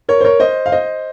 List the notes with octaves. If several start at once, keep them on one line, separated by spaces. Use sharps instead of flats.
A#4 C#5
C5
A#4 C#5
C5 D#5
F5
C5 D#5